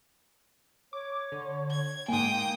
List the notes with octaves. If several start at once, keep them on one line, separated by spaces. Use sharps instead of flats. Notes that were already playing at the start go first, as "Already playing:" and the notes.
C#5 D6
D3
G#6
G#2 A#3 G5 G#5 D#6